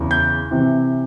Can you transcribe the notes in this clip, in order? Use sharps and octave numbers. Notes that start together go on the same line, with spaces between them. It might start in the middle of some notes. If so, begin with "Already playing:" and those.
Already playing: E2 C#3 E3
G6
C3 E3